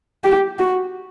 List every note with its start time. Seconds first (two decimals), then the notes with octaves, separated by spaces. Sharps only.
0.24 G4
0.59 F#4